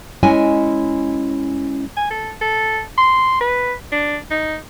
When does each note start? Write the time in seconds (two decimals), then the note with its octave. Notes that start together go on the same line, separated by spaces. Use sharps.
0.23 G#3 C#4 E4 C#5 D#5 G#5
1.97 G#5
2.11 A4
2.41 A4
2.98 C6
3.41 B4
3.92 D4
4.31 D#4